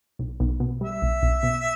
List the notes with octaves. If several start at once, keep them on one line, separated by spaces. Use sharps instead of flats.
B1
B1
B2
G3 E5
B1
B1
B2